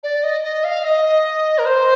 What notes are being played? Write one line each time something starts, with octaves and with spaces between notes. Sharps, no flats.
D5
D#5
D#5
F5
D#5
A#4
C5